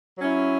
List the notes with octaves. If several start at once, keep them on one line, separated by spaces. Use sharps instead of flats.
F#3 C#4 E4